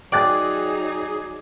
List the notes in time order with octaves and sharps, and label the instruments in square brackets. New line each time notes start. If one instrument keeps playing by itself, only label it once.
[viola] F#3 D#4 [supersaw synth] G#4 [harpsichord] D5 [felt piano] G5 F#6 A6